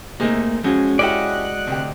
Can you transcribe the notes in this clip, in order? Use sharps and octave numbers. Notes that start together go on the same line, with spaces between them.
C3 A3 A#3 D#4 G#4
F2 G#3 C#4 F#4
C#4 E4 G4 D5 D#5 F#5 F#6
D2 C3 G4